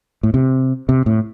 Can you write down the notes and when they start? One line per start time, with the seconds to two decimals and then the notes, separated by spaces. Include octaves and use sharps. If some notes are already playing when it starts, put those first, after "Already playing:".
0.23 A2
0.34 C3
0.89 C3
1.06 A2